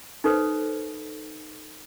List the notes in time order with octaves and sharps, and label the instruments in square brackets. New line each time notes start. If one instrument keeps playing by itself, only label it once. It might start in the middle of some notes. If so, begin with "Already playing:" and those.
[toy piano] D#4 A4 B4 C5